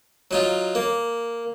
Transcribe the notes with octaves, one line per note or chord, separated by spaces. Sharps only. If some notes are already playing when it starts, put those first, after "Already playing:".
F#3 D#4 F4
A#3